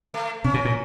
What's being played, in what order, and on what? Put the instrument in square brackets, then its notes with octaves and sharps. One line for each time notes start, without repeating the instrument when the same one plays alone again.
[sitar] A3
[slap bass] C3 [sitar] C#4
[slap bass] B2
A#2